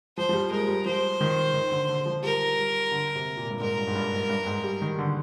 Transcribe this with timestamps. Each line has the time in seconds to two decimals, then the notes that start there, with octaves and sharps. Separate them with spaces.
0.17 F3 C5
0.29 F3
0.33 G3
0.51 G#3 A#4
0.68 G3
0.86 F3 C5
1.21 D#3
1.54 D#3
1.72 D3
1.89 D3
2.06 F3
2.23 G3 A#4
2.58 G3
2.91 D3
3.15 C3
3.37 A#2
3.50 G2
3.60 G#2 A#4
3.78 G2
3.87 G#2
3.95 G2
4.13 G#2
4.29 G2
4.46 G#2
4.64 G3
4.82 D#3
4.98 D3